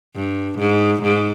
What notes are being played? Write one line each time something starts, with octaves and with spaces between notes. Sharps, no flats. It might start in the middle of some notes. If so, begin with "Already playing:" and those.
G2
G#2
G#2